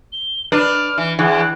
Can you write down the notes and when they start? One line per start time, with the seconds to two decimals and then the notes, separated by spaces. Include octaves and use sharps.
0.12 G7
0.52 D4 B4 F6
0.98 E3
1.19 E2 E3 F#6